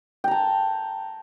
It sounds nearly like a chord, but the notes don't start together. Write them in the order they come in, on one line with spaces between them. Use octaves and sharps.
G5 A#5 A5